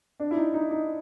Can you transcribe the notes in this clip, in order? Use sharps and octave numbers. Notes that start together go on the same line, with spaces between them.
D4
E4
D#4
D#4
D#4